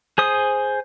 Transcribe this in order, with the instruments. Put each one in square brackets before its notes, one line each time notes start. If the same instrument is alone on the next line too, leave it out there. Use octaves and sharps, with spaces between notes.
[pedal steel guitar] G#4 C5 D#6